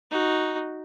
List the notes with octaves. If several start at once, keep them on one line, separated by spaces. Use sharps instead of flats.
D#4 F#4